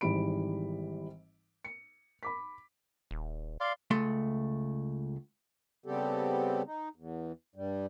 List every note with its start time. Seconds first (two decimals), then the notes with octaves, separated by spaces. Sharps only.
0.01 G#1 G#2 E3 G3 B5 D7
1.64 C#7
2.23 B5 D6 B6
3.11 D#1
3.60 D5 F5 C6
3.91 C#2 A3 C6
5.86 C#3 G3 B3 C4 G4 A4
6.66 D#4
6.96 E2
7.56 G2 G3